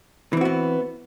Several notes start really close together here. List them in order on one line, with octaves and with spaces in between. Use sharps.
E3 C4 F#4 B3